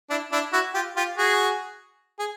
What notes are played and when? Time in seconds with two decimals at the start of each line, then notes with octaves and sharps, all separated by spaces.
0.10 D4 E4
0.32 D4 E4
0.53 E4 F#4
0.74 F4 G4
0.97 F4 G4
1.17 F#4 G#4
2.19 G#4